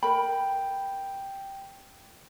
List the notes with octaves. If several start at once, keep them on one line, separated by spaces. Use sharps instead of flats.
A#4 G5 B5